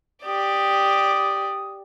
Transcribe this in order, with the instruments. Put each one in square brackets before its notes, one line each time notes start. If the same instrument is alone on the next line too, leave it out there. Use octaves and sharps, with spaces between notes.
[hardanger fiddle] G4 D5 [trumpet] D#6